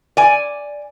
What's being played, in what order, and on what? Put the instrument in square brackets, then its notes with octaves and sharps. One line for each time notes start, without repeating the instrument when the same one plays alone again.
[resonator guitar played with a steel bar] D5 G#5